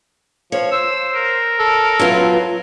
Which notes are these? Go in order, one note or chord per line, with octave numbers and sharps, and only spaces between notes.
F3 C#5
C5 E6
A#4
A4
F#3 B3 F4